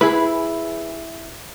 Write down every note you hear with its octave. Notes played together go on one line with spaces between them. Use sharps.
E4 G#4 B4